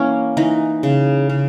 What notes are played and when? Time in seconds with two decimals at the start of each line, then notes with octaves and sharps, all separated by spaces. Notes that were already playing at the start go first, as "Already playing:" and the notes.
Already playing: E3 A#3 C#4 E4
0.37 E3 D#4
0.83 C#3
1.29 C#3